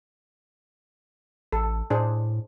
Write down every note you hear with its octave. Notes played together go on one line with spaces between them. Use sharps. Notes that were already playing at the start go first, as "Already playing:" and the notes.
A1 A4
A2 D4 G#4 C5